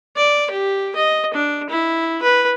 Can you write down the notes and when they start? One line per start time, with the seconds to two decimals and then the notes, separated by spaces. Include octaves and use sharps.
0.17 D5
0.51 G4
0.96 D#5
1.34 D4
1.70 E4
2.23 B4